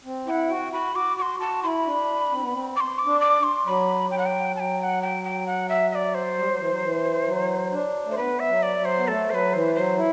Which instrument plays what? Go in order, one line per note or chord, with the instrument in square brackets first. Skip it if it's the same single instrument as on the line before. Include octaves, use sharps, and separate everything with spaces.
[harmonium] C4
[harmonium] E4 [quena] G5
[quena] F#5
[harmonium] F#4 [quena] G5
[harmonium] F#4 [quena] B5
[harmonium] F#4 [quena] D6
[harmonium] F#4 [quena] C6 D6
[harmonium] F#4 [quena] A5
[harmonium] E4 [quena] B5 C6
[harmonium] D4
C4
B3
C4
[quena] D6
C6
D6
[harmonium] D4
[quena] D6
C6
[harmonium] F#3 [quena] B5
[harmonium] F#3 [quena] G5
[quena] F#5
G5
[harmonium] F#3 [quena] G5 A5
[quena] G5
F#5
G5
G5
F#5
E5
E5
D5
C5
[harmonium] G3
F#3
E3
F#3
E3
F#3
D4
A3
[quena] C5
[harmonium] B3 [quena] B4
[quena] E5
[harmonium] F#3
[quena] D5
[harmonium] F#3
[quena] C5
[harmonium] B3
[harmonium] A3 [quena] A4
[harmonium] F#3 [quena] C5
[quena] B4
[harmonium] E3 [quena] C5
[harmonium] F#3 [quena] C5
[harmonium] E4